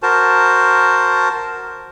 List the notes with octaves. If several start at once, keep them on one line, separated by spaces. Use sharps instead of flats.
F#4 A#4 C5 A5